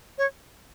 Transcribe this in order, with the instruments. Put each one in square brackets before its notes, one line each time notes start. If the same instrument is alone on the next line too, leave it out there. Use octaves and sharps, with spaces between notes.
[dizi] C#5